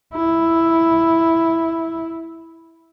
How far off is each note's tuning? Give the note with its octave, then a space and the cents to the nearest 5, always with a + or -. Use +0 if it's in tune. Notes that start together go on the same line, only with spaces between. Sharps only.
E4 +0